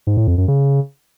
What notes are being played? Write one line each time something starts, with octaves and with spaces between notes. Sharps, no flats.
G#2
A2
F2
F#2
C#3